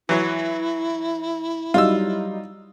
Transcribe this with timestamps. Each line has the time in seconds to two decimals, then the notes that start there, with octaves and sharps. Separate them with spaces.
0.09 E3 F#3 E4
1.74 F#3 G3 D#4 F4 E6